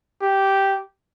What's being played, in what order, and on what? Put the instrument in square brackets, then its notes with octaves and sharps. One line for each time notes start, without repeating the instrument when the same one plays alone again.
[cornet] G4